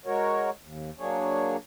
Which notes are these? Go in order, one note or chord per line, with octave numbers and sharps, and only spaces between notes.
G#3 F#4 A#4 C#5
D#2
F#3 A#3 D4 G#4 C#5